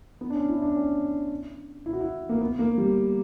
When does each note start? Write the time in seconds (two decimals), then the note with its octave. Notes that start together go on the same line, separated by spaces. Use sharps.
0.21 B3
0.30 D4
0.35 C#4
0.49 E4
0.62 D4
0.76 C#4
1.86 E4
1.93 F#4
2.01 E4
2.29 A#3
2.41 B3
2.59 A#3
2.78 G3